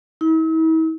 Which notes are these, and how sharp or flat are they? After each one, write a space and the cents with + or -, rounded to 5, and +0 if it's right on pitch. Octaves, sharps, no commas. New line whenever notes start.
E4 -45